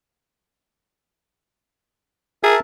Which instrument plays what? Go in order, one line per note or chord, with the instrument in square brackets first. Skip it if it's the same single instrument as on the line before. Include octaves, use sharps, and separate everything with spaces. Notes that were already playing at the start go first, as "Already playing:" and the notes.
[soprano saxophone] G#4 [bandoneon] A#4 E5 A5